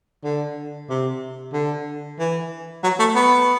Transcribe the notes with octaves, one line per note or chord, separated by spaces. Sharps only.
D3
C3
D3
E3
F#3
A3
B3